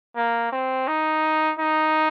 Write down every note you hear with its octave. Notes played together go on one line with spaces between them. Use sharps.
A#3
C4
D#4
D#4